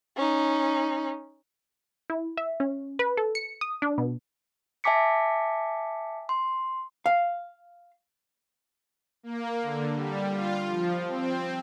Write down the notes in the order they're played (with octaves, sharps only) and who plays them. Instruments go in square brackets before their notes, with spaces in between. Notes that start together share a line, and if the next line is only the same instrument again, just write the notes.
[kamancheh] C#4 D#4
[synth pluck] E4
E5
C#4
B4
A4
C#7
D#6
D4
B2
[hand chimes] E5 G#5 A5 D6 B6 C#7
C6
[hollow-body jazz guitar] F5
[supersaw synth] A#3
D3
G3
F4
F3
C4